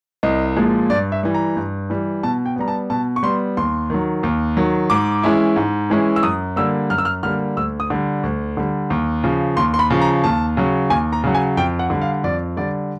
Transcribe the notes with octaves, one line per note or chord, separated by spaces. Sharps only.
C2 D#5
A#2 F3 G#3
G2 D5
E5
E3 G3
A#5
G2
E3 G3
B2 A5
G5
G3 B3 A#5
A5
B2 A5
C#6
G3 B3 C6
D#2 C6
D#3 F#3
D#2
D#3 F#3
G#2 D6
E3 G#3 C#4 E4
G#2
E3 G#3 C#4 E4
E6
F#2 D#6
D3 G3 A#3 E6
F#2 F6
E6
F6
D3 G3 A#3 F6
D2 E6
D#6
D3 G3
D2
D3 G3
D#2
C#3 F3
D#2 C6
C6
B5
C#3 F3
A#5
D#2 A5
C#3 F#3
D#2 G#5
A#5
C#3 F#3
G#5
F2 G5
F#5
D3 G3
F5
F2 D5
D3 G3 D5